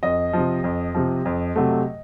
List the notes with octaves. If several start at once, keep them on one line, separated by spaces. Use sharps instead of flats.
F2 D#5
C3 F3
F2
C3 F3
F2
C3 F#3 A3